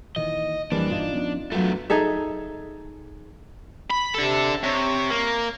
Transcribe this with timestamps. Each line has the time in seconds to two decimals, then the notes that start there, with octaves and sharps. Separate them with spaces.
0.16 A#2 D#3 E3 D#5
0.72 F2 E3 G3 A#3 D4
0.90 G2 A#2 E3 D#4 F4
1.13 F3 B3 C#4
1.52 E2 F#3 A3 B3 D4 F4
1.90 D#4 G#4 A4 E5
3.90 B5
4.14 C3 D4 A4
4.63 C3 C#5
5.10 A#3